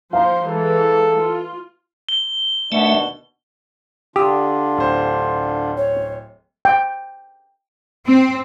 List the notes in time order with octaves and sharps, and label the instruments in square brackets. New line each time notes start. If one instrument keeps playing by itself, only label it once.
[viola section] F3 C5 [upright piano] F5 A#5
[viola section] E3 G#3 [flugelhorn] A4
[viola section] F4
[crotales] G7
[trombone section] D#2 B2 D4 [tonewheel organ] A3 E5
[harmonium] D3 D4 F4 [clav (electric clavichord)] G4 [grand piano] D#6 E6
[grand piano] D1 C5
[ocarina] C#5
[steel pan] G5
[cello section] C4